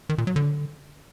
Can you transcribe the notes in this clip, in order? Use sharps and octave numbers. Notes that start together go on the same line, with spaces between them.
D#3
A#2
F#3
D3